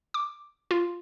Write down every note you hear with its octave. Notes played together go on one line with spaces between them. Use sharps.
D6
F4